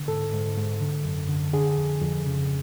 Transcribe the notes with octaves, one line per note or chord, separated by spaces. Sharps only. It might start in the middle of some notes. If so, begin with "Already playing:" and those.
Already playing: D3
G#2 A4
G#2
G#2
D3
F#2
D3
D3 G#4
F2
F2
C#3